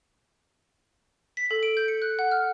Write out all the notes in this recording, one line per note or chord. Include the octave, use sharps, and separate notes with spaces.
B6
A4
D7
G6
C#7
F#6
F#5
F6